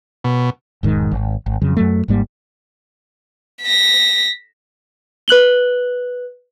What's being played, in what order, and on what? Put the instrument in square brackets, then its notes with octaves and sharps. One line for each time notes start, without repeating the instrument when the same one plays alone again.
[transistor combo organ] B2
[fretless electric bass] E1 G#2 D#3
G#1
G#1
F2 C#3 F#3
F#2 F#3 A3
G#1 G#2 G3 A#3
[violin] A#6 B6
[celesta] B4 F#6 F#7 G7